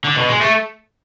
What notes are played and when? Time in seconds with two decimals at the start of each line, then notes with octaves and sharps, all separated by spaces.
0.05 D3
0.17 B2
0.29 G#3
0.41 A3